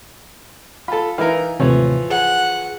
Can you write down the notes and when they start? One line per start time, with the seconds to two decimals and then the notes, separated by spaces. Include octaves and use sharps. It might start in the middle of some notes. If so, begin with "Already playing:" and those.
0.88 F4 A4 A5 B5
1.18 E3 D#4 E4 A#4 F5
1.60 D#2 A2 C3 E3 F3 C#5
2.10 G#4 F#5